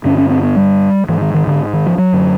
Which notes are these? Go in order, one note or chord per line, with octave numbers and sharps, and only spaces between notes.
G2 D3 C#4
C#4
C4
B3
G3
G#2 E3
D#3
D#3
D3
D#3
F3
F#3
F#2 D3